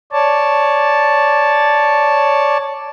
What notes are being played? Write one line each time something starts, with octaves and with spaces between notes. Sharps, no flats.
C#5 D5 A5